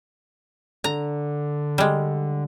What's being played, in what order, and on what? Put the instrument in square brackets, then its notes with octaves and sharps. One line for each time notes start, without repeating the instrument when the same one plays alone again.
[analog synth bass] D3 [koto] A#5
[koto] G3 G#3